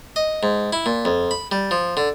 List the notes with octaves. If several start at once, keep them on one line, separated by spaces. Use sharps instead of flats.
D#5
G#2
E4
A#2
F2
B5
G3
F3
D3